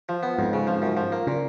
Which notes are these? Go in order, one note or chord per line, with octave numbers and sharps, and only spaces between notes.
F3
B3
F2 G#2
C#3
F3
F#2
F3
A#3
A#2 C#3